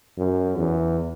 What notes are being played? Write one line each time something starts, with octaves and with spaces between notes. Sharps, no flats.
F#2
E2